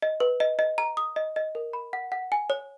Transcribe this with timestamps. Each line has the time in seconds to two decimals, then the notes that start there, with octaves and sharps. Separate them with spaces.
0.02 D#5
0.20 B4
0.40 D#5
0.59 D#5
0.78 A#5
0.97 D#6
1.16 D#5
1.36 D#5
1.55 A#4
1.73 B5
1.93 F#5
2.12 F#5
2.32 G#5
2.50 C#5